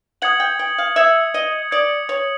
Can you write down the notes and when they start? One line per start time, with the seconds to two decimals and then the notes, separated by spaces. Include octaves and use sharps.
0.22 F#5 D#6 G#6 C#7 F#7
0.40 G5
0.59 G5
0.78 F5
0.96 E5 D#6 G#6 C#7 F#7
1.34 D#5
1.71 D5 D#6 G#6 C#7 F#7
2.09 C#5